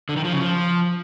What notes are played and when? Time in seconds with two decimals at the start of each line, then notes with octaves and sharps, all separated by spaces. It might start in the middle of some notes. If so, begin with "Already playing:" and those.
0.09 D3
0.17 D#3
0.25 F3
0.32 C#3
0.40 F3